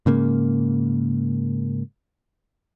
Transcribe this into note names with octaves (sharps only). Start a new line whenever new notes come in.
G#2 C#3 A#3